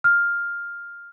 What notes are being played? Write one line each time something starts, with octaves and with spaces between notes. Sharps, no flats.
F6